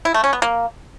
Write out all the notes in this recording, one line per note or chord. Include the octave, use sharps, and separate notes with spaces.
E4
A3
C#4
B3
A#3